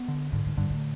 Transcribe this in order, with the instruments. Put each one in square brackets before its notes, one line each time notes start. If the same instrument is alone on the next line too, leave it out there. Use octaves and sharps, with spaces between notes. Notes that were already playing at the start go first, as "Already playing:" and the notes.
Already playing: [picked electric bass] B3
D3
[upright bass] G#2 [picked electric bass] D3
[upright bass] G#2
[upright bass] G2 [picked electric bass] D3
[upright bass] A2